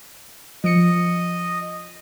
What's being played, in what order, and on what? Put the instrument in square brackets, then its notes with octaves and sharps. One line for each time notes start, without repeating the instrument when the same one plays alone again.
[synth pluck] F3 C#7 [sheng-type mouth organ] D#5